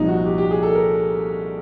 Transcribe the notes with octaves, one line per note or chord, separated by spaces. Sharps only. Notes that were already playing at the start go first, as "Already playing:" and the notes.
Already playing: C2 A#2 F3 D#4
F#4
G4
G4
G#4
A4
A#4